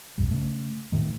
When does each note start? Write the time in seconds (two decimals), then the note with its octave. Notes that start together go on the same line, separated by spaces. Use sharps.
0.18 F1 B1 G2 G3
0.31 C#3 A3
0.92 A2 D#3 A3